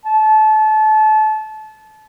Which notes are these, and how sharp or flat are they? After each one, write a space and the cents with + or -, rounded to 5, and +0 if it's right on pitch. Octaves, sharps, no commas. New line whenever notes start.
A5 -30